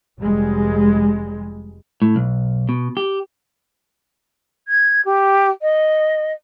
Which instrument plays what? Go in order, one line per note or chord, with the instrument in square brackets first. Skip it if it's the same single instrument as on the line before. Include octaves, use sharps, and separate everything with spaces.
[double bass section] F1 G3 G#3
[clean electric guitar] A2
B1
B2
G4
[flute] G#6
G4
D#5